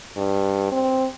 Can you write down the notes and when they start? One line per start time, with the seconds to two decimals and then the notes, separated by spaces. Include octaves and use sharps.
0.16 G2
0.72 C4